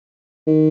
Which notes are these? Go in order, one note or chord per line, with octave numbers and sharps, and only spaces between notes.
D#3